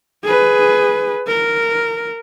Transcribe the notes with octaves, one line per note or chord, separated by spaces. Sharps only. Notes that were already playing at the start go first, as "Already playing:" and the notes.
G#4 B4
A#4